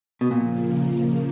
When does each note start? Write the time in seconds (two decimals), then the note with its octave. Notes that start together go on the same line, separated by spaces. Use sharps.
0.21 B2
0.31 A#2 C#3 F3 A#3